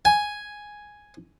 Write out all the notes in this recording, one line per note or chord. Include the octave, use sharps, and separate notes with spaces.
G#5